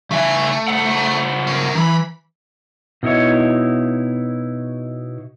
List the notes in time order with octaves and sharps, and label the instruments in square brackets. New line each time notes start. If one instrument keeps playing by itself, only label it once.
[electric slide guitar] C#3 E5 G#5 [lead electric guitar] A3
[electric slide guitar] C#3 C5 F#5
[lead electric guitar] C#4 A#4
[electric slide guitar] E3 [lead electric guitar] F#3 B5
[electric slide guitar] B2 D#4 E4 C#5